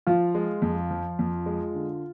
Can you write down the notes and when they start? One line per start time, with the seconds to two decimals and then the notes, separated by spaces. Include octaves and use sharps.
0.07 F3 F4
0.35 G#3
0.62 F2
0.91 F3
1.19 F2
1.46 G#3
1.74 D3